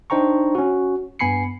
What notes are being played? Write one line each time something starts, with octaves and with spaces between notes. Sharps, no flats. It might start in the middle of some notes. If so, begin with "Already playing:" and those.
D4 D#4 C5 G5 A#5 C#6
C#4 F#4
G2 B3 G#5 B5 C7 C#7